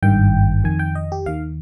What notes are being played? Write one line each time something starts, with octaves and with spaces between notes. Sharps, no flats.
G#1 G2 D#3 G5
F2 D#3 G#5
G5
D#5
G4
D#2 D#3 F5